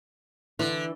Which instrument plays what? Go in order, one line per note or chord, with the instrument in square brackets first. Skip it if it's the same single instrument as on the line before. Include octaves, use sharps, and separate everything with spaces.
[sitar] D3 [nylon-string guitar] E3 E4